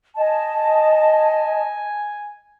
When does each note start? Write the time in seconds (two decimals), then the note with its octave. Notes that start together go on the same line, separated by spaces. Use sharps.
0.16 D#5 G#5 A5